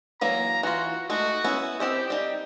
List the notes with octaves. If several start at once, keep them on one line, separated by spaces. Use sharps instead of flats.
E3 F#3 A#3 A#5
E3 F4 F#4
G#3 A3 D#4 F#4
B3 C#4 E4
C4 E4 G4 D#5
G3 D#4